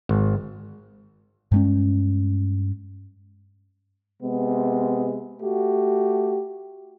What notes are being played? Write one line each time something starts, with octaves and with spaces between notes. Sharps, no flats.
G#1
G2 G#3 C#4
C3 G#3 B3
A3 F#4 G4